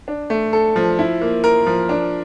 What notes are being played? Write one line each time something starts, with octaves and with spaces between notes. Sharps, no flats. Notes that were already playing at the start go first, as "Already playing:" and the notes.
D4
A3
A4
F3
E4
A#3
A#4
F3
D4